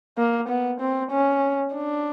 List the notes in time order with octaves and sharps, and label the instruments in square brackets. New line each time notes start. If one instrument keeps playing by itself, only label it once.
[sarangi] A#3
B3
C4
C#4
D4